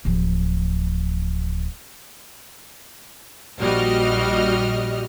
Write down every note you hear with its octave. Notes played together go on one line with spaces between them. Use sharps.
D1 F3
A#1 G3 F#4 D#5 F6